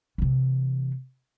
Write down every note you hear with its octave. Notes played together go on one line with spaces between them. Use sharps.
C3 E3